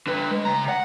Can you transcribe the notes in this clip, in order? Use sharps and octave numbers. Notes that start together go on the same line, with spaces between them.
D3 B4
G#3
C#3 A#5
F#5